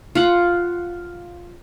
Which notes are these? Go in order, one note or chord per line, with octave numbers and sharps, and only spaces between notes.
F4 F#5